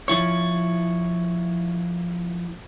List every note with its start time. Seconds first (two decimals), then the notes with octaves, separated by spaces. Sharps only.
0.08 F3 E4 C#5